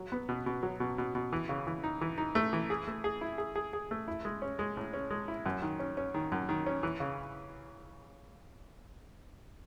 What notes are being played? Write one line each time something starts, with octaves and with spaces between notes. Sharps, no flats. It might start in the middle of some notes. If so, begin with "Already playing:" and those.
Already playing: F#3
B3
B2
B2
F#3
B2
B2
B2
E3
C#3
E3
D#4
E3
D#4
A3
E3
G#4
A3
G#4
E4
G#4
G#4
G#4
A3
E4
G#3
C#4
G#3
A2
C#4
G#3
E4
F#2
D#3
C#4
C#4
D#3
F#2
D#3
C#4
E3
C#3